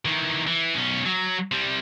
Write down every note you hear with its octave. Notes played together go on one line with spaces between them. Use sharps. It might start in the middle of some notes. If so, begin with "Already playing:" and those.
D#3 E3
E3
B1 C#4
F#3
C3 G3